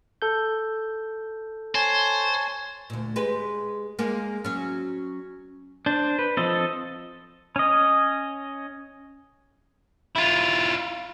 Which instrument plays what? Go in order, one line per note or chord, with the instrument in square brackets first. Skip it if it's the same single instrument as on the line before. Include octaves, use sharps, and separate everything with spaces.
[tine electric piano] A4 G6
[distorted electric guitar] C5 [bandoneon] C#5 G#5 A5
[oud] D2 A#2
G#3 G4 B4
G#3 A#3
F#3 C#4
[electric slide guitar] D4 [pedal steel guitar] C5
[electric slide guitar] B4
[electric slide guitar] F3 C4 [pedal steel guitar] A4 D#5
[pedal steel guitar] C#4 D#5
[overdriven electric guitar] E4 F4